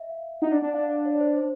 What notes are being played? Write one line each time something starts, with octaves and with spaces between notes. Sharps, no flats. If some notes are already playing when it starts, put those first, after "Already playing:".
Already playing: D#5 E5
F5
D#4 F#5
D4
D4
D4 F5
D5
C#5
C5
C5